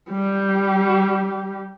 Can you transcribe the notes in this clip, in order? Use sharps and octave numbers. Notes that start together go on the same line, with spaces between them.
G3 G4